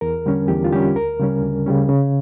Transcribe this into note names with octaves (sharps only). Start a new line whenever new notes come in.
E2 A#4
D3 G3 C#4
E2 G4
F4
D3 G3 C#4 G4
D2 A#4
C#3 G3 C#4
D2
C#3 G3 C#4
C#3